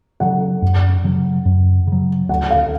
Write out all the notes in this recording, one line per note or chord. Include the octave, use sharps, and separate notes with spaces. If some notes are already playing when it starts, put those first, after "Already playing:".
C#3 F#3 F#5
F#2
C#3 F#3
F#2
C#3 F#3
D2 F#5
F5